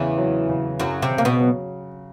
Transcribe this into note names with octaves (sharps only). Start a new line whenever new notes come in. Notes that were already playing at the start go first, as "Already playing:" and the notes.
Already playing: E2 C#3 E3
F#3
C#3
F#2 C#3 F#3
C3 C4
C#3
A#3
B2 B3
F#3